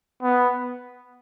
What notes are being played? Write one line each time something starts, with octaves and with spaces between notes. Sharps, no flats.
B3